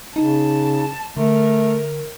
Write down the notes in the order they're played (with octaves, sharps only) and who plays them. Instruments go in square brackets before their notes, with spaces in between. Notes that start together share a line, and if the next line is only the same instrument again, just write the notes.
[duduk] C#3 [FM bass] D#4 [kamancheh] A5
[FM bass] D3 [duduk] A3 [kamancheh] A#4